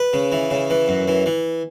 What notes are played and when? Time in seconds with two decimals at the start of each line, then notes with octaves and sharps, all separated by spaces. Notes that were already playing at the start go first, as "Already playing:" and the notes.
Already playing: B4
0.13 C#3
0.32 E3
0.51 C#3
0.70 E3
0.88 F#2
1.08 E3
1.26 E3